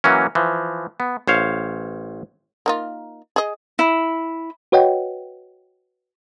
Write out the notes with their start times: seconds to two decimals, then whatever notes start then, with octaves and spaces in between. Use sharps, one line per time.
0.04 E3 F#3 A#3 C#4
0.35 E3 F3
1.00 B3
1.28 A1 C5 C#5 F5
2.66 A#3 D#4 F4
3.36 G#4 D#5
3.79 E4
4.72 F#4 B4 C#5 D#5 F#5 G5